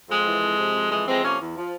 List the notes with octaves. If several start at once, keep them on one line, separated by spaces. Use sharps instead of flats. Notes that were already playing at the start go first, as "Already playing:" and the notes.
F2 G#3
E3
F2
C3
F2
E3 G#3
F2 G#3 C4
C3 A#3 C#4
E2
F3